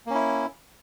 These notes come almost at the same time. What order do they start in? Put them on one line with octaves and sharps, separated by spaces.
A#3 C#4 E4